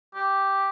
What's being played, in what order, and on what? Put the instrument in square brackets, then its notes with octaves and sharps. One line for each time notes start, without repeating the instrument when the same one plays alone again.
[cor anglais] G4